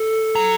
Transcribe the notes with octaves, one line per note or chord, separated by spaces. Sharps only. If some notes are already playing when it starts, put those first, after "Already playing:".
Already playing: A4
F#3